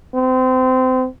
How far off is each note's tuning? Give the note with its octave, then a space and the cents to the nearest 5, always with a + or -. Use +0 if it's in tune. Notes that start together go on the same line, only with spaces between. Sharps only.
C4 -25